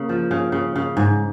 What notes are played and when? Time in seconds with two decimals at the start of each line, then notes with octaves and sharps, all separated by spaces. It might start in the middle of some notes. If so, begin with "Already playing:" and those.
Already playing: C#3 A#3
0.09 F3
0.31 C#3
0.52 C#3
0.76 C#3
0.97 G#2